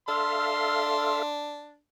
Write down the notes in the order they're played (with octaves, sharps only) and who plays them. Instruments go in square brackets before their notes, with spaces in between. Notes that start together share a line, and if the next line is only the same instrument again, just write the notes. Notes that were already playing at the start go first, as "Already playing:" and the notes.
[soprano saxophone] D4 [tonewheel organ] A4 E5 F5 [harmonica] C6